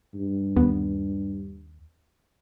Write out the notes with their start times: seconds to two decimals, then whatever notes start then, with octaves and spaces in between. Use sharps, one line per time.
0.15 G2
0.56 D#2 B3